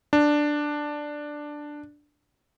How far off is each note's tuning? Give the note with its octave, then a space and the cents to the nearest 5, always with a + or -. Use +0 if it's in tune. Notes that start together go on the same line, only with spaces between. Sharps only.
D4 +5